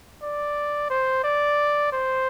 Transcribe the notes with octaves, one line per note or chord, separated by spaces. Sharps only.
D5
C5
D5
C5